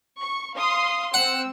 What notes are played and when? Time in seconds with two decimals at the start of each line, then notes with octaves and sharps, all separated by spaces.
0.19 C#6
0.56 F5 C6 D#6
1.14 C4 F#5 E6